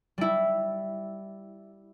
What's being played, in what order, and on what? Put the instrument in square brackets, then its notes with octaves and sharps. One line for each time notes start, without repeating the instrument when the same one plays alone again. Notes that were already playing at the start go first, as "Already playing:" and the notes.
[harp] G3 E4